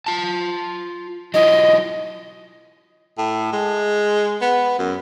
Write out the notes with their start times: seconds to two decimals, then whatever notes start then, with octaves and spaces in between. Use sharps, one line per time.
0.06 F4 A5
1.34 F#3 E4 F4 D#5
3.18 A2
3.53 G#3
4.41 B3
4.79 F#2